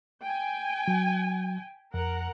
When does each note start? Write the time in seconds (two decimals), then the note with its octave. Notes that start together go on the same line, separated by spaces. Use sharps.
0.23 G5 G#5
0.88 F#3
1.94 F2 A#4 F#5